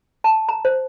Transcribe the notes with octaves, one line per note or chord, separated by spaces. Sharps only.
A5
A#5
C5